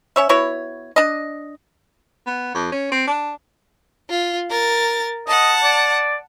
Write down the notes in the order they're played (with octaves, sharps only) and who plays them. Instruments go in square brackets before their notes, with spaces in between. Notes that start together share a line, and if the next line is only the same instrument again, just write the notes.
[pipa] C#4 C#5 E5
B3 E4 F#4 C#5
D4 D#5
[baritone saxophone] B3
F2
C#4
C4
D4
[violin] F4
A#4 A6
[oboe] D#5 [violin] F#5 A5
[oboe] D5